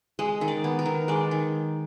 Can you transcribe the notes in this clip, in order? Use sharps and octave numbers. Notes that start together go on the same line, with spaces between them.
G#3 D#5
D#3
D5
B3
A#4
D#3
G#3 D5
D#3